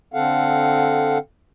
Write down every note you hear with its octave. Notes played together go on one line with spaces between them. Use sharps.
D3 C4 A4 F5 F#5